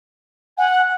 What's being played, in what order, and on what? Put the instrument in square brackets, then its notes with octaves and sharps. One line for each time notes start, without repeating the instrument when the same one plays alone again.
[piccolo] F#5 [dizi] G#5
[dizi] F#6